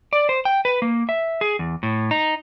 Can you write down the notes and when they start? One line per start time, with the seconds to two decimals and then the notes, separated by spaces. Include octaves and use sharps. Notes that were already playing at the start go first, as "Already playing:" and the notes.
0.13 D5
0.29 C5
0.45 G5
0.65 B4
0.82 A#3
1.09 E5
1.41 G#4
1.59 E2
1.83 A2
2.11 D#4